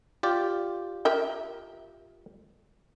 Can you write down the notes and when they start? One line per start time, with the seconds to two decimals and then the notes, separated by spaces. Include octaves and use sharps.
0.23 F4 G4 D5
1.05 A#4 E5 G5